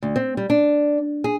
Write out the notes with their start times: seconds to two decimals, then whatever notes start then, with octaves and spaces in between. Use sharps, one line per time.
0.03 D2
0.16 C4
0.37 G3
0.50 D4
1.24 G#4